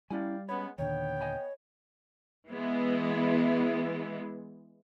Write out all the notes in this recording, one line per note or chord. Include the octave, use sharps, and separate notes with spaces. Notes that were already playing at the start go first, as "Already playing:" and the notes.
G3 C#4 E4 D5 F5 G5 G#5
G#3 B3 C#4 C#5 B5
D#2 A#2 D3 D#3 B3 C#5 G5
D#5 G#5 B5
E3 G#3 B3